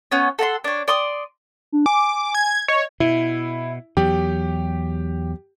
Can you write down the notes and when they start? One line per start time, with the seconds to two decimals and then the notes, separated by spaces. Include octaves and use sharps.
0.11 B3 C#4 C#5
0.39 A4 F#5 A#5 C6
0.64 D4 C#5
0.88 D5 C6 D#6
1.72 D4
1.86 G#5 D6
2.35 G#6
2.68 C#5 D#5
3.00 B2 E4
3.97 E2 F#3 G4